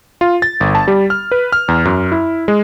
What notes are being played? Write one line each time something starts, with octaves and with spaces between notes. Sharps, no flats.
F4
A6
G1
A5
G3
F6
B4
F6
E2
F#2
E4
G#3